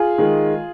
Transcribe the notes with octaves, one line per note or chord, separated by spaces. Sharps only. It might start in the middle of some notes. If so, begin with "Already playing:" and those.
Already playing: F4 G#4
D#3 G#3